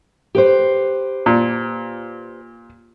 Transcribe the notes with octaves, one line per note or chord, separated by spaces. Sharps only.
G4 B4 C5
A#2